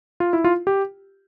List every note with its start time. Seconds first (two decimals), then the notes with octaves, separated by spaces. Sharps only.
0.20 F4
0.33 E4
0.44 F4
0.67 G4